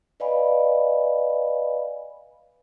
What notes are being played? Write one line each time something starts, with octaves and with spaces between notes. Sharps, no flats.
B4 D5 D#5 F5 G#5 B5